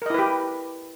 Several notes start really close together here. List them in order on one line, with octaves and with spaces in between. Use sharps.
A#4 D#5 E4 B4 G4